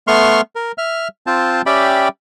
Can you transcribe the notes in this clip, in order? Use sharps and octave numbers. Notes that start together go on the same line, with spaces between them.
A3 B3 C6 C#6 F6
A#4
E5 F6
C4 F4 C5 A5
C#4 G4 D5 E5 G5 B5